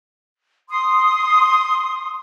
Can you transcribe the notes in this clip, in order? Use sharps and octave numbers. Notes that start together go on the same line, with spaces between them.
C6 D#6